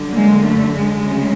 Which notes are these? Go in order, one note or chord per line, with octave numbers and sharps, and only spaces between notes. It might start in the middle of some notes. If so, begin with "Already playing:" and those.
Already playing: F#2 D3 G3
G#3 A#3
A3
G#3
D2 C#3 F#3